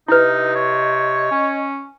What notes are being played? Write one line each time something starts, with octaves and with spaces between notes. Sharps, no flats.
C3 D#4 E4 B4 D#5
C#5
C#4